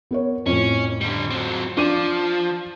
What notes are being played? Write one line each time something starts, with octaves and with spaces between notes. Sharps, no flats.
B3 A#4 C#5
F2 A2 C#4
D3 G3
F#3 C4
F3 D4 D6 D#7